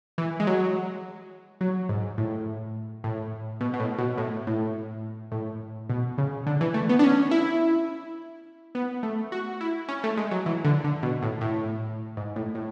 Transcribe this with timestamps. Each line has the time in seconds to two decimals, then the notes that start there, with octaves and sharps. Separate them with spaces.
0.18 E3
0.40 G#3
0.47 F#3
1.61 F#3
1.89 G#2
2.18 A2
3.04 A2
3.61 B2
3.74 B2
3.80 A2
3.98 B2
4.17 A2
4.47 A2
5.32 A2
5.90 B2
6.18 C#3
6.46 D3
6.61 E3
6.74 A3
6.89 B3
6.99 D4
7.04 C#4
7.31 E4
8.75 B3
9.03 A3
9.32 F#4
9.61 E4
9.88 C#4
10.04 A3
10.17 G#3
10.31 F#3
10.46 E3
10.65 D3
10.84 D3
11.03 B2
11.22 A2
11.41 A2
12.17 G#2
12.36 A2
12.55 A2